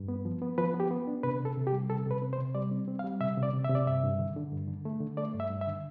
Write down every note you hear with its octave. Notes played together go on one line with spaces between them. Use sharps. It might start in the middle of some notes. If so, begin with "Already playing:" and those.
Already playing: G2
B3
F3
B3
F3 B4
B3
G4
B3
D4
C3 B4
C3
A4
C3
G4
G3
C3 A4
C3 B4
C4
C5
C3
G3 D5
C4
C4
F5
G3
C3 E5
C3
D5
C3
E5
C3
D5
G2 E5
G2
D3
D3
G2
D3
A3
D3
A3 D5
G2
E5
G2
E5
D3